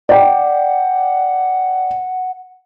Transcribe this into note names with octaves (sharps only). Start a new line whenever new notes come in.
D5 F#5 G5